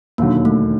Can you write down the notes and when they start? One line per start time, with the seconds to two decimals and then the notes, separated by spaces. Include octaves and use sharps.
0.18 E1 D#2 D3 F#3 A#3
0.45 A3